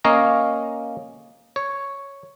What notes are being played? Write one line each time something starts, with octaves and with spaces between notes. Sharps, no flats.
A#3 C#4 C#5 D#5 F5 A#5
C#5